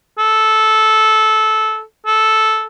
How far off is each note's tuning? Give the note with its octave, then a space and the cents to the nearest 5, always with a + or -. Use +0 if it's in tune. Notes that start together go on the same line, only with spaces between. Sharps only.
A4 -15
A4 -10